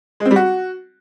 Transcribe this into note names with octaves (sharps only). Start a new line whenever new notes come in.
G#3
C4
G3
F#4